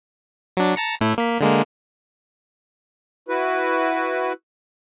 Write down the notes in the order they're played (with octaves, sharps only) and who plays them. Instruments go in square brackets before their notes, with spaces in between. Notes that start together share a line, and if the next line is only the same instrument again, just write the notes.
[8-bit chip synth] F#3 D4
A5 A#5 C#7
A2 A3 E4
A#3 B6
D3 G#3 A#3
[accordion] E4 F#4 B4